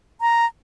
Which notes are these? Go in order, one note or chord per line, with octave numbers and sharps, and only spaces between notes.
A#5